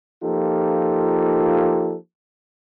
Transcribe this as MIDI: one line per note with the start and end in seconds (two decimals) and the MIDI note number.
0.23 1.95 53
0.23 1.95 58
0.23 1.95 63
0.23 1.95 65
0.23 1.95 67
0.23 1.95 69